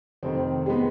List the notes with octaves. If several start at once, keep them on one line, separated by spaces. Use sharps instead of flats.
F1 F2 D#3 C4
G#3
B3